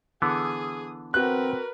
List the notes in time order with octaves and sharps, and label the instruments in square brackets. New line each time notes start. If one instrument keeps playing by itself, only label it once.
[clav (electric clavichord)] D3 E3 B3 [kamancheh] G#4 D#6
[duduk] C4 [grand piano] F#4 F#6 [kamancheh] A#4 B4